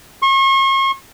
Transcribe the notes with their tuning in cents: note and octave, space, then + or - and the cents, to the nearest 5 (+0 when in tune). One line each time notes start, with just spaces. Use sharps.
C#6 -40